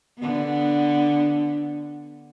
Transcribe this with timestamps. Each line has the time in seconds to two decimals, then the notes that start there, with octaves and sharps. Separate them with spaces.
0.20 D3 B3